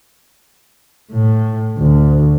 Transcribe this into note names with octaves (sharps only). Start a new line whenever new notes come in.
A2
D2